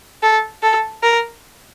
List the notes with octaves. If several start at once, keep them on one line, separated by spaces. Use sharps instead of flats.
A4
A4
A#4